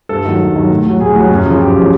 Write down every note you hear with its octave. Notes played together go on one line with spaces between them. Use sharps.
G2 A4
D#3 F#3
G2
D#3 F#3
A2
F#3
A2 G#4
F#3
F#2
C#3 F3
F#2 G4
C#3 F3